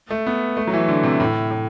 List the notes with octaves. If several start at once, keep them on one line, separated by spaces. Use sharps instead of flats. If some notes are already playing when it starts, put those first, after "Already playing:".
A3
B3
A3
F#3
E3
D3
C3
A2
A2